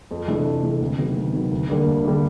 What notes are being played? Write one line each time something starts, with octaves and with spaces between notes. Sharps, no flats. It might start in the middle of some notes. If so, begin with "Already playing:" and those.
F2
C3 E3 A3 D4
F2
C3 E3 A3 D4
D2
C3 D#3 F#3 B3
D2
C3 D#3 F#3 B3
D2
D3 G3 A#3 D4
D2
D3 G3 A#3 D4